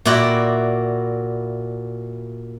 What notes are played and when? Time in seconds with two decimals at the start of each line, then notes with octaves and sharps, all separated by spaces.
0.05 A#2 E4 F#4 D5 G5